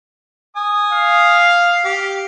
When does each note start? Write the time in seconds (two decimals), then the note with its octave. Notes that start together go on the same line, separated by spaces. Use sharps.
0.56 G#5 D#6
0.92 F5
1.85 G4